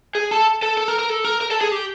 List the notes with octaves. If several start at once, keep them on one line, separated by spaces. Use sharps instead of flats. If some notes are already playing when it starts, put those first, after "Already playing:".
G#4
A4
A4
A4
A#4
A#4
A4
A#4
A#4
A4
G#4
G4